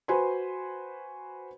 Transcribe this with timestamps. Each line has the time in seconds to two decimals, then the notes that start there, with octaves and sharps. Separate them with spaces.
0.08 F#4 B4 C5 G#5 B5 C6